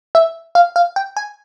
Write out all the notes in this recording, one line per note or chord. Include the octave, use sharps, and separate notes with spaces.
E5
F5
F5
G5
G#5